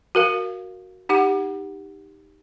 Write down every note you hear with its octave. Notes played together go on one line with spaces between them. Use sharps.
F#4 A#4 F5
D#4 G4 F#5